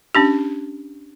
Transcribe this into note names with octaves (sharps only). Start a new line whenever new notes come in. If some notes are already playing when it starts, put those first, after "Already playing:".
C#4 D4 G4